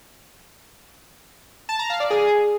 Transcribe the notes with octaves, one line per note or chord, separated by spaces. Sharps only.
A5
A#5
F5
D5
G#4